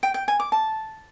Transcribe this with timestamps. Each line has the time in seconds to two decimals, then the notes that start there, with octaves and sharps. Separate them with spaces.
0.03 G5
0.14 G5
0.28 G#5
0.40 D6
0.52 A5